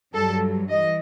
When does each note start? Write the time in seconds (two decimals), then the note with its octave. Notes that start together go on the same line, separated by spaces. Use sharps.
0.14 G2 F#3 A4
0.70 E3 D#5